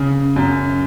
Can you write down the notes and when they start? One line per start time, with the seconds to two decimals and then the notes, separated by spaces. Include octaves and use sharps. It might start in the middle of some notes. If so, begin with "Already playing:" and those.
Already playing: C#3
0.36 F#2